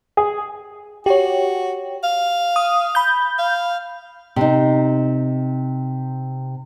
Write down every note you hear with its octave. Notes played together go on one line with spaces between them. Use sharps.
G#4
F#4 G4 C#5
F5
D#6
B5 G6
F5
C3 D#4